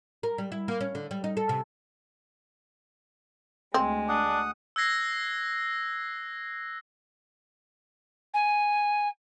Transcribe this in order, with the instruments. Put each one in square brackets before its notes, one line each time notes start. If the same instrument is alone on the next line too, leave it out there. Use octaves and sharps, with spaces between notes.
[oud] A#4
G3
E4
A#3
C#4
D3
G3
D#4
A4
C3
[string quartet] D2 G#3 [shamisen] C4
[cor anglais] D4 [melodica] F#5 D#6
[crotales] E6 F#6 G#6 A#6 C7
[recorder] G#5